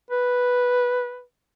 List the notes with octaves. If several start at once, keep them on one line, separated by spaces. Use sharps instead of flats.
B4